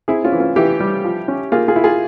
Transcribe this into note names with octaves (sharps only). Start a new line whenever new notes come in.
C4 E4 G#4
C#4 F4
E3
C#4 F4
E3 E4 G4
G3
F3
C#4
A#3 F4 G#4
F4 G#4
E4
F4 G#4